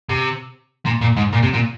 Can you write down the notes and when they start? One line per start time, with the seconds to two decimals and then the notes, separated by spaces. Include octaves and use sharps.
0.09 C3
0.86 A#2
1.01 A#2
1.17 G#2
1.33 A#2
1.43 C3
1.53 A#2